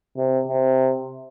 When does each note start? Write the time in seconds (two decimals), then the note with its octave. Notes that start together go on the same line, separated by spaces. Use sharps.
0.17 C3
0.48 C3